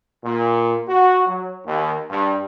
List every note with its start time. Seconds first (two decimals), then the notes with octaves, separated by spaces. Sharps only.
0.24 A#2
0.88 F#4
1.26 F#3
1.66 D#2
2.10 G2